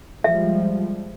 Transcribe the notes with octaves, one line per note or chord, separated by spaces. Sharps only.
F3 G3 G#3 E5